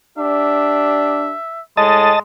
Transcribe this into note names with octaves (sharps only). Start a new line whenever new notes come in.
D4 G4 E5
A2 G#3 D#5 A5